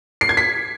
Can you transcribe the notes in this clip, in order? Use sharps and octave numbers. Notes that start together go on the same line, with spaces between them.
C7
G#6
B6